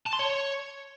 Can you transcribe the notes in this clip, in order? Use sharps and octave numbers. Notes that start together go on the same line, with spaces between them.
A5
C6
C#5